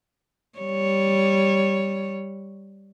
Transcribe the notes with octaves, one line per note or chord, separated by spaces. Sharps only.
G3 C#5